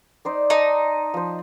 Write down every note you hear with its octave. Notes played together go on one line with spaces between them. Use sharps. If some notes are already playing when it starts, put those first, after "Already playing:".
D#4 C5 D5
D#4 A5
F3 C5